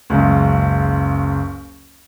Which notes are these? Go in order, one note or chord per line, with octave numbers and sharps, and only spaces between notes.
F#1 C#2